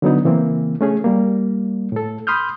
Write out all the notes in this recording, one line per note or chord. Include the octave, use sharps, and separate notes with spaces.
D3 F#3 B3 D#4
C#3 E3 A#3 C4
A3 C#4 G#4
G3 A#3
A2 A4
B5 C6 D#6 F6 G6